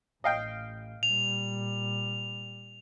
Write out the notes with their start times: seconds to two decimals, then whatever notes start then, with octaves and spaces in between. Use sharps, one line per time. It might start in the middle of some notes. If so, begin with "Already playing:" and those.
0.24 A1 D#5 F5 G5
1.03 A#2 G3 F7